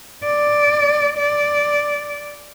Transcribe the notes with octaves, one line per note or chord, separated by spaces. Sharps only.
D5
D5